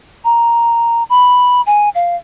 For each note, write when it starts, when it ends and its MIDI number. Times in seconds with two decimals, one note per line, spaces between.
0.24 1.03 82
1.09 1.61 83
1.66 1.89 80
1.95 2.16 77